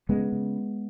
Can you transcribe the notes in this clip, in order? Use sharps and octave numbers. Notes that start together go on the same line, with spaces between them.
C#3 G#3 B3
C#3